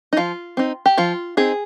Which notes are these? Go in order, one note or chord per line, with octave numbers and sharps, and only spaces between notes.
D#4
F3 F4
C4 D#4
G4
F3 F4
C4 D#4 G#4